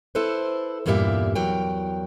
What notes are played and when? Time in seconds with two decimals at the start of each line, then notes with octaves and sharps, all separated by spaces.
0.15 E4 A4 B4 C5
0.86 E2 G2 A#2 A#3 G4 E5
1.35 E2 F#3 A#4 G5